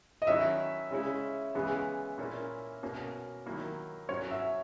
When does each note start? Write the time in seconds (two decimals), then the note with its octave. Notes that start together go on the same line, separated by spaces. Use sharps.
0.22 D#5
0.27 D#3 F#3 C#4 E4 E5
0.91 C#3 G#3 C#4 E4
1.55 C#3 E3 G#3 B3
2.18 A#2 A#3 C#4 E4
2.83 B2 A#3 C#4
3.46 D#3 F#3 A#3 E4
4.09 F#3 C#4 F#4 C#5
4.31 E5